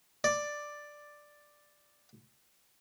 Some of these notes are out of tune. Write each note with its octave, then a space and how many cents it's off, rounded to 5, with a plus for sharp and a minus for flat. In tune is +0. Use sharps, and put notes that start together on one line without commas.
D5 +5